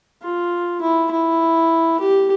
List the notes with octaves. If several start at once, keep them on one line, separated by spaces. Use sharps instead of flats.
F4
E4
E4
G4